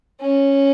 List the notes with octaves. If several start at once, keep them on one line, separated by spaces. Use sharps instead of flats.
C#4